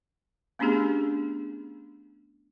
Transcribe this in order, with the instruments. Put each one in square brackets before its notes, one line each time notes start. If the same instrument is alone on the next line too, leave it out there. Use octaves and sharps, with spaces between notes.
[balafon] A3 B3 C#4 D4 G4 G#4